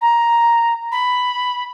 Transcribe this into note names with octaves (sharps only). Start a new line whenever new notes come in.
A#5
B5